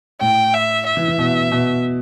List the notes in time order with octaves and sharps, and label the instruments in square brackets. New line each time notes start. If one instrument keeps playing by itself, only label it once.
[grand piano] A2 [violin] G5
[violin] E5
E5
[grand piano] E3
E3
B2
B2